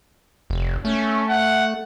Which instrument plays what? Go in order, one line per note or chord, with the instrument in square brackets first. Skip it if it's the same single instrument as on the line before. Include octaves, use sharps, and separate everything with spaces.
[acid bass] F1
[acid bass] A3 [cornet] C#4
[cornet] F#5